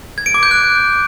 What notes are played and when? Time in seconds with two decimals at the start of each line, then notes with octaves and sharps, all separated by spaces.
0.18 G#6
0.26 D7
0.34 D6
0.43 G6
0.51 F#6